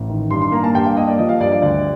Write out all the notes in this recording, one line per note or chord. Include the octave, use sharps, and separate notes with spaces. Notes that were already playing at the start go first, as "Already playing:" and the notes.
Already playing: A1
D#3
G2 C6
C6
A#3 A#5
A5
G2 G5
F5
A#3 D#5
D5
F3 D#5
F5
G2 D5
D5
D2 D5